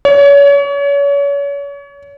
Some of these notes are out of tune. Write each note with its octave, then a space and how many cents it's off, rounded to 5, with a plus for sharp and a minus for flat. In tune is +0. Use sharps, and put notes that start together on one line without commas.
C#5 +35